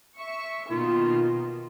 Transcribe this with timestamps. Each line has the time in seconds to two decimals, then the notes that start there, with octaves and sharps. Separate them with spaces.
0.17 E5 C#6
0.71 B2 D#3 A#3 F4